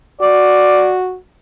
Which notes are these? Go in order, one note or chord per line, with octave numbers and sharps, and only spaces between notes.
F#4 D5